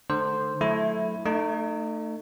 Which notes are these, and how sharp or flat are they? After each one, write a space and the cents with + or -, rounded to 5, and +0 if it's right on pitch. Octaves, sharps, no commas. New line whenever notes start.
D3 +25 A3 -45 C5 +0
F#3 -20 A3 -15 E4 +0
A3 +20 D#4 -30